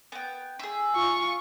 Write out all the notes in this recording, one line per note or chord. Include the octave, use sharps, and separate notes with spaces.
B3 G5
G#4 E5
F4 C#6